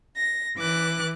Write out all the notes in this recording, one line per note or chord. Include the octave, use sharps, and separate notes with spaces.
A#6
E3 D6 F#6